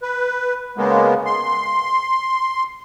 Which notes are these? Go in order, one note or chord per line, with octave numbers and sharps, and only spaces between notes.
B4
C#3 G#3 A#3 B3
C6